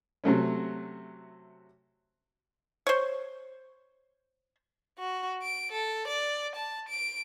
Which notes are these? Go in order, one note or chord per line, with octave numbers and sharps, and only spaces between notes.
C3 F#3 A3 C#4
C5 C#5
F#4
D7
A4
D5
A5
D7